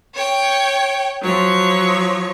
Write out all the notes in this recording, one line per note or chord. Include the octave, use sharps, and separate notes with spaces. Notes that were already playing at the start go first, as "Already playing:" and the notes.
C#5 G5
F3 F#3 C#5